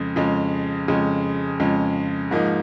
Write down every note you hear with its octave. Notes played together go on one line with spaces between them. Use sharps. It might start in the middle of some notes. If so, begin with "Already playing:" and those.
Already playing: F2 C#3 G#3
F2 C#3 G#3
F2 C#3 G#3
F2 C#3 G#3
G#2 F3 A#3 D#4